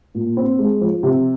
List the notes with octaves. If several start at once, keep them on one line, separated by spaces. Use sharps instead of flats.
A#2
C4
G#3
F3
C3